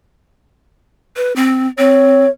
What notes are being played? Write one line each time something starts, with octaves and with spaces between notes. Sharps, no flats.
B4
C4
C4 C#5